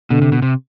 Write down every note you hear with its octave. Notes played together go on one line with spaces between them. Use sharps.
B2 D3
C3
B2
C3